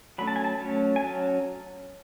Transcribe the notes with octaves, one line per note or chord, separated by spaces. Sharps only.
F#3 A3 C#4 B5
A5
G#5
A5
F#3 A3 C#4
G#5
F#3 C#4 A5